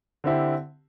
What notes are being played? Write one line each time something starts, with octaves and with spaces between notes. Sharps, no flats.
D3 C4 E4 G4